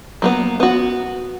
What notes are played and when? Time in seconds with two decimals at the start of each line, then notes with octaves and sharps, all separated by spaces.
0.22 F#3 A#3 B3
0.60 B3 F#4